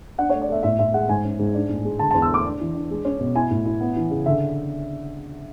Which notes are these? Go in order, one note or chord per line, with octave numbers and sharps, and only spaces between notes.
D4 F#5
C#5
A3
D5
A3 E5
A2 E5
A2 E5
G#3 F#5
G#2 G#5
C#4
G#2
D4
A2
G#3
D3 A5
A5
E2
E6
A3 D6
D4
E3
D4
G#3
C#4
B2
E4 G#5
A2
E4
B3
E3
C#3
D3 E5